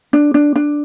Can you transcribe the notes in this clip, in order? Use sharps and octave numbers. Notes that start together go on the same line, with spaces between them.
D4
D4
D4